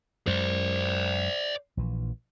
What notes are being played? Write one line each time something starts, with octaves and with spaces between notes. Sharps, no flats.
F#2 G#3 C5 D5
A#1 A#2 E3